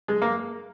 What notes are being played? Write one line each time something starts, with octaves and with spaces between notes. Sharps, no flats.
G#3
A#3